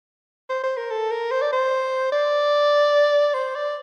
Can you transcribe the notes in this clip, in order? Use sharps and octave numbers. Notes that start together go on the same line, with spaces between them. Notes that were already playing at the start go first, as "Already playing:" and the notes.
C5
C5
A#4
A4
A#4
C5
D5
C5
D5
C5
D5